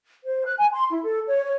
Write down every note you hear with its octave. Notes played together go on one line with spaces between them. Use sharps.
C5
F#6
G#5
C6
E4
A4
C#5
C#5